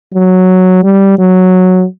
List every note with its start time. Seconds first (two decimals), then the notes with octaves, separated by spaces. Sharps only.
0.14 F#3
0.83 G3
1.18 F#3